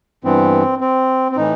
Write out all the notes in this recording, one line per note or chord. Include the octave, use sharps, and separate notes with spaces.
G2 E3 B3 C4
C4
C4
A2 E3 D#4